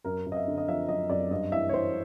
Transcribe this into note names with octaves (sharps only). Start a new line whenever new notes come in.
F#2 A#4
F#2
D#5
E5
D3
D#5
F3 E5
F#2 D#5
F#2 D5
G2 D#5
E3 E5
C#5
E3 C5